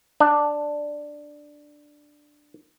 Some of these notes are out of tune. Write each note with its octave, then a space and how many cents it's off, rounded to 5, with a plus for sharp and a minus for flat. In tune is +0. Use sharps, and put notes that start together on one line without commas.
D4 +5